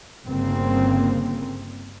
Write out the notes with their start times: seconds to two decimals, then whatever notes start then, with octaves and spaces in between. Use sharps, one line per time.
0.24 G1 C#3 A#3 C4